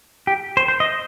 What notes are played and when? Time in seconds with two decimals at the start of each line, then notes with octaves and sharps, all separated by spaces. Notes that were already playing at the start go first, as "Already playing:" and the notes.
0.27 G4
0.57 C5
0.68 C5
0.80 D#5